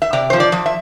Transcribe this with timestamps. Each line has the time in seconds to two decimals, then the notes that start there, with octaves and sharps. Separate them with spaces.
0.02 E5
0.13 C3 D5
0.30 F3 C5
0.40 D5
0.52 F3
0.66 E5